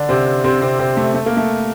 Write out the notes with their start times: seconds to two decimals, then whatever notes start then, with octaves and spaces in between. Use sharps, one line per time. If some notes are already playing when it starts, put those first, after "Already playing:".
Already playing: D3 D4
0.09 C3 C4
0.44 C3 C4
0.61 C3 C4
0.79 C3 C4
0.97 A3
1.14 A3
1.26 A#3
1.37 A3